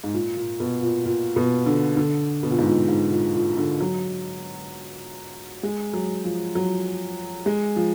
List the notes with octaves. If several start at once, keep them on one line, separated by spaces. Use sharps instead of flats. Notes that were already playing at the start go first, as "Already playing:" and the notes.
G#2
A#2
A#2
B2
A#2
A#2
B2
D3
D3
B2
A#2
G#2
A#2
G#2
A#2
A#2
D3
F#3
G#3
F#3
F3
F#3
G#3
F3